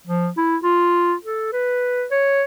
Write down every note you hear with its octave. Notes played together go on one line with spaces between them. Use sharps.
F3
E4
F4
A4
B4
C#5